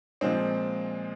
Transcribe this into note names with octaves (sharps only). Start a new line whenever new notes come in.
A#2 F3 G#3 C4